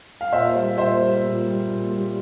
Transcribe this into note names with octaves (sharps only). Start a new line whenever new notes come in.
F5
A#2 C5 E5
G3
A#2 C5 E5
G3
A#2
G3
A#2
G3